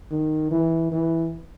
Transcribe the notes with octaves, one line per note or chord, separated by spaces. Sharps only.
D#3
E3
E3